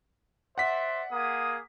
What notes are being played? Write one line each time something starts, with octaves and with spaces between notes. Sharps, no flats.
C5 D5 E5 F#5 B6
A#3 G#4 D#6